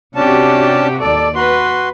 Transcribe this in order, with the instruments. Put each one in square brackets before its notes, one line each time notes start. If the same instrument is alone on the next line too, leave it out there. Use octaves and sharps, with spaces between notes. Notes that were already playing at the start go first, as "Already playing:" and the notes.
[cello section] C3 F#4 G4 [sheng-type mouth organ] C#4 D4 A5
[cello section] D#2 D5 [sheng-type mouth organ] A4
[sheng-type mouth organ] F#4 C6 [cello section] B4